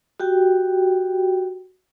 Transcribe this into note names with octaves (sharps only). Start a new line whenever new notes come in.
F#4 G4 G5